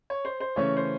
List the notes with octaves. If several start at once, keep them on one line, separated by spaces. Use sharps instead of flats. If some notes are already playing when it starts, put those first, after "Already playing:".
C#5
C5
C5
C#3 E3 A3 C#4 C#5
C5